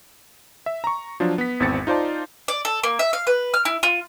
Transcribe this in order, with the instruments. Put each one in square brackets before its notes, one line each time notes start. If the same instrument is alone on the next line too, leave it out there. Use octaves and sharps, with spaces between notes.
[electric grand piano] E5
A#5 C#6
F3 F#3 D4 F4
B3 B6
G#1 E2 E3 C4 A6 C#7
D#4 F4 C5 D5 A5
[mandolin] D5
A4
A#3
E5
F5
B4
F6
E4
F4